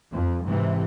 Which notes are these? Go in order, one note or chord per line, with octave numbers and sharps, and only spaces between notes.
F2
G#2 C3 E3